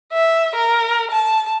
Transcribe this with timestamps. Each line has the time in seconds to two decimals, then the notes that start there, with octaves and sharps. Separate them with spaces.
0.13 E5
0.56 A#4
1.11 A5